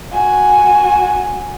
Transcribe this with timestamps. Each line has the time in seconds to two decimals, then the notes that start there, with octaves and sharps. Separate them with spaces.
0.12 F#4 G#5